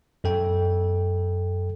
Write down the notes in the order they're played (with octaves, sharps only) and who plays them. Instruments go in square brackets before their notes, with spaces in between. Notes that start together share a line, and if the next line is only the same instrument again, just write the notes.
[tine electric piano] F#2 A4 G5